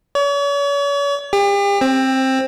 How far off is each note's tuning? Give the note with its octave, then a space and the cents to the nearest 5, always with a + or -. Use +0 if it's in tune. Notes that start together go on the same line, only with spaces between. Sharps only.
C#5 +40
G4 +40
C4 +15